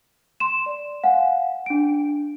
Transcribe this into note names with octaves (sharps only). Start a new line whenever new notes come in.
C6 E7
D5
F5 F#5 G#5
D4 D7